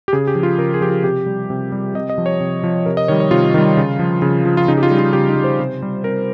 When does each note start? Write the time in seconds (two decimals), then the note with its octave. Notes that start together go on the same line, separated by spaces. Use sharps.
0.08 G4
0.13 C#3 G#4
0.27 G4
0.35 F3
0.43 F4
0.59 C#3 A#4
0.74 G#4
0.81 F3 G4
0.89 F4
1.03 C3 G4
1.26 G3
1.50 C3
1.72 G3
1.95 C3 D#5
2.10 D#5
2.18 F3
2.26 C#5
2.40 C3
2.64 F3
2.86 C3 A#4
2.97 D#5
3.08 D#3 G3 C#5
3.20 C#5
3.31 C3 F4
3.54 D#3 G3
3.77 C#3
3.99 F3
4.22 C#3
4.45 F3
4.57 F4
4.68 C#3 D#4
4.78 G4
4.83 F4
4.91 G3
4.99 F4
5.13 C#3 G4
5.29 D#4
5.36 G3
5.44 C5
5.59 C3
5.82 G3
6.04 C3 A#4